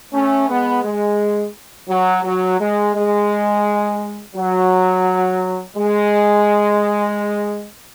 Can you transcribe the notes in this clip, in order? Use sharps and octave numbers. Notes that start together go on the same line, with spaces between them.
A3 C#4
G#3 B3
G#3
F#3
F#3
G#3
G#3
F#3
G#3